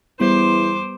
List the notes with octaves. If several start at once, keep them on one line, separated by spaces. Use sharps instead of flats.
E2 G3 B3 C5 C6 D6